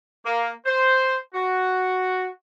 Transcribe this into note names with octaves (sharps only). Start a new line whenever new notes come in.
A#3
C5
F#4